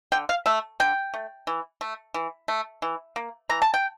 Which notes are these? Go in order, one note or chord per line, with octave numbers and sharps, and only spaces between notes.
D3 G5
F5
A3 E5
D3 G5
A3
E3
A3
E3
A3
E3
A#3
E3 A#5
A5
G5